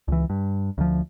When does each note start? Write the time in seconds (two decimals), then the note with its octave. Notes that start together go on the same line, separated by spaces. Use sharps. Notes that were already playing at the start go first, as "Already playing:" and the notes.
0.08 C#2 E3
0.30 G2
0.78 D2 F3